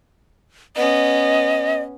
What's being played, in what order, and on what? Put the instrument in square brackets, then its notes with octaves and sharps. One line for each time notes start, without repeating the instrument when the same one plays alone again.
[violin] B3 C#4 [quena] D#5